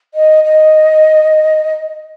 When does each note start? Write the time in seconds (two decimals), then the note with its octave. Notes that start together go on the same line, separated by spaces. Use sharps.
0.14 D#5
0.44 D#5